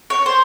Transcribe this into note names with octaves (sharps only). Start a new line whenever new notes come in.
C#5
C5